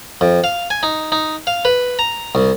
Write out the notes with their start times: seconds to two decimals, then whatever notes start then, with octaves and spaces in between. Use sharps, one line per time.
0.21 F2
0.44 F5
0.70 G#5
0.83 D#4
1.12 D#4
1.47 F5
1.65 B4
1.99 A#5
2.35 C2